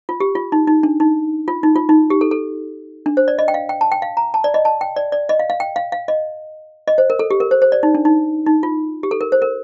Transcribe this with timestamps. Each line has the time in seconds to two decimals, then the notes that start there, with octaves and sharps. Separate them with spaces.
0.09 F4
0.20 G4
0.35 F4
0.52 D#4
0.67 D#4
0.83 D4
1.00 D#4
1.48 F4
1.63 D#4
1.76 F4
1.89 D#4
2.10 G4
2.21 A4
2.31 A4
3.06 D4
3.17 C5
3.28 D5
3.39 D#5
3.48 G5
3.54 F5
3.69 G5
3.81 A5
3.92 G5
4.02 F5
4.17 A#5
4.34 A5
4.44 D5
4.54 D#5
4.65 A5
4.81 G5
4.96 D5
5.12 D5
5.29 D#5
5.39 F5
5.50 F5
5.60 G5
5.76 F5
5.92 F5
6.08 D#5
6.88 D#5
6.98 C5
7.10 A#4
7.19 A4
7.31 G4
7.40 A#4
7.51 C5
7.62 C5
7.72 D5
7.83 D#4
7.95 D4
8.05 D#4
8.46 D#4
8.63 F4
9.03 G4
9.11 A4
9.21 A#4
9.32 C5
9.42 A#4